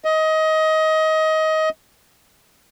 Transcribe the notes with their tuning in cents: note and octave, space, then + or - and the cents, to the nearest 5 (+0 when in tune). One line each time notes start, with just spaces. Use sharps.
D#5 +20